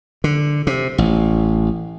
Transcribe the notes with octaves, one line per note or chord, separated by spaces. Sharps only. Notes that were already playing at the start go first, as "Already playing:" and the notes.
D3
C3
A1